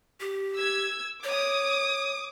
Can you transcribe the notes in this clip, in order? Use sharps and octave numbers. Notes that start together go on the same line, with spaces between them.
G4
E6 G#6
C#5 D6 D#6